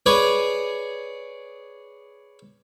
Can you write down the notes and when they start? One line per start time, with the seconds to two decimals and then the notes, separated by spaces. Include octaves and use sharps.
0.06 G#4 B4 C#5 D5 D#6